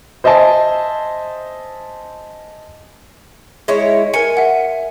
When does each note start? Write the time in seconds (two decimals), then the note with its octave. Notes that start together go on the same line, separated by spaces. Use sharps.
0.24 C5 D#5 E5 G#5 A5
3.68 G#3 E4 C#5
4.14 A#4 G#5 C#7
4.37 E5 F#5